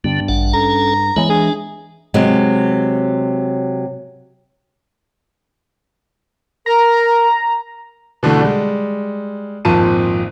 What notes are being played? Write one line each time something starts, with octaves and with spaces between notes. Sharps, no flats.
G2 D3 B3
A1 D4 F#5
C#4 A4 A#5
E3 G#3 B3 E4 C#5
D4 G#4
C3 F#3 G#3
A#4 A#5
B2 D3 E3 A3
G3 G#3
G#1 F2 A#2 F3 A5 D#7